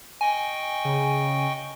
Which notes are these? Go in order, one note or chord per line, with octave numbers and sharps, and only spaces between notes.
D#5 G5 G#5 C#6
C#3